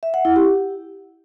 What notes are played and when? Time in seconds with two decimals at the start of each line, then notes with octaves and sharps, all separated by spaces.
0.03 E5
0.14 F#5
0.25 E4
0.36 G4